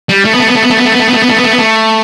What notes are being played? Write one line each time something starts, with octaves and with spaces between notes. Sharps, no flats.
G3
A3
B3
A3
B3
A3
B3
A3
B3
A3
B3
A3
B3
A3
B3
A3
B3
A3
B3
A3